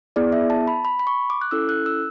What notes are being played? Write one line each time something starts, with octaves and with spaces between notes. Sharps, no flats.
B3 E4 G#4 D5
E5
A5
B5
B5
B5
C#6
D6
F#6
C#4 E4 A4 E6
F#6
E6